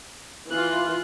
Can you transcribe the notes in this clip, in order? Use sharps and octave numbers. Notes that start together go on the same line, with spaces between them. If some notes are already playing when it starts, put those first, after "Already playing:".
E3 F4 F#6